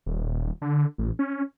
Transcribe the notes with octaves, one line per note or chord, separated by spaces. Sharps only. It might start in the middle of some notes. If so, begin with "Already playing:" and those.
D#1
D3
A1
C#4